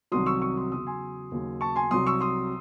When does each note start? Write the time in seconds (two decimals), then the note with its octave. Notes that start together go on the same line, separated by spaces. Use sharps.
0.12 C2 C3 D#3 F#3 C6 D#6
0.26 C#6 E6
0.42 C#6 E6
0.57 C6 D#6
0.71 E2 C#3 F#3 C6 D#6
0.87 G#5 C6
1.32 D#2 C#3 F#3
1.61 A5 C#6
1.76 G#5 C6
1.91 C2 C3 F#3 C6 D#6
2.07 C#6 E6
2.21 C6 D#6